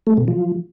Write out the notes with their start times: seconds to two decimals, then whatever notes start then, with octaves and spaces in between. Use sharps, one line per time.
0.07 A3
0.17 B2
0.28 F3